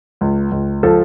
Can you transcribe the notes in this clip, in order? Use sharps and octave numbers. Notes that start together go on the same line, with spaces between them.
C#2
C#2
F3 A4